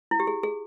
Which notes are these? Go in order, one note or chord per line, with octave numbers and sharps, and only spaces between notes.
E4
G4
G#4
G#4